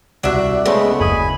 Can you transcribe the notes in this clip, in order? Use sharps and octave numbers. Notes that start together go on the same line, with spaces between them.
C2 D4 F#4 E5 F#6
C#3 G#3 A3 B3 A4 D#5
F#1 G#5 B5 D#6